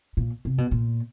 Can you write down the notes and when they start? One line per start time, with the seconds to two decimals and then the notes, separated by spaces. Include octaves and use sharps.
0.17 A#2
0.45 C3
0.58 B2
0.71 A#2